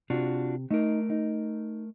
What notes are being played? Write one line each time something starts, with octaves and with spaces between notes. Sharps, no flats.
C3 D4 F4 F#4
A3 D#4 A#4
D#4